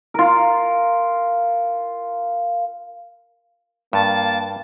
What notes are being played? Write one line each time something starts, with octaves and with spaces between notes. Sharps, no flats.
F4 A#4
G2 A#3 A5